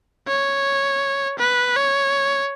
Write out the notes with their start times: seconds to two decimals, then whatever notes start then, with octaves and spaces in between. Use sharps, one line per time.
0.28 C#5
1.39 B4
1.76 C#5